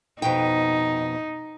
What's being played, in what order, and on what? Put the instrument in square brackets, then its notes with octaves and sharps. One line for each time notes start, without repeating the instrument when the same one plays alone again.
[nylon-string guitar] F2 B2 G5 [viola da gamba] D#4